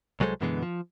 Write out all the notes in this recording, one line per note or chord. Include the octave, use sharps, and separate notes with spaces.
C2 F#3 G#3 A4 C5
F#2 B2 D3 E3 G#3 B3
F3